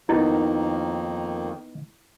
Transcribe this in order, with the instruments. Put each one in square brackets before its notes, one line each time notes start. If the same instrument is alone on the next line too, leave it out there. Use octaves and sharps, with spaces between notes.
[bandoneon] F2 D#3 A#3 [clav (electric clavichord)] B3 D#4 [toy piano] E4